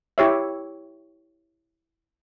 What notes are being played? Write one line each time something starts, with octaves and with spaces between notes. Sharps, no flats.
E4 G4 C#5 E5